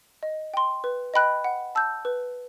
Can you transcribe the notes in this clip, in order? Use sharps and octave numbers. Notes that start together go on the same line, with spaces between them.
D#5
G5 C6
B4
D#5 G5 B5 F#6
F#5
A5 E6 G6
B4